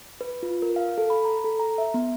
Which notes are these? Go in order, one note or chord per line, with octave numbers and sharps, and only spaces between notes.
B4
F4
A#4
F5
A4
B5
A#5
A4
A#5
E5
B3